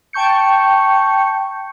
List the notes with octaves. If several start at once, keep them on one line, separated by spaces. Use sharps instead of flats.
G5 A5 C#6 G6 C#7